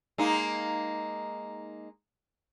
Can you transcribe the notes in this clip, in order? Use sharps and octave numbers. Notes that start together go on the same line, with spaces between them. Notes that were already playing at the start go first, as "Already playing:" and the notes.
G#3 A#3 D#4